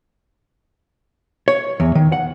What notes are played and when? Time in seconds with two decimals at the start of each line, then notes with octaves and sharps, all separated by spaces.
1.48 C#5
1.80 E2
1.95 D#3
2.12 F#5